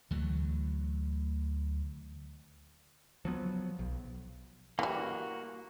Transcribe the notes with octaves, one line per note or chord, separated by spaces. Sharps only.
D2 E3 F#3 A3
F3 F#3 B3
B1
E3 G3 A#3 F#4